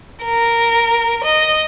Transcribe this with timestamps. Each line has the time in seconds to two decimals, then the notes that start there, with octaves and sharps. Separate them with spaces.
0.24 A#4
1.24 D#5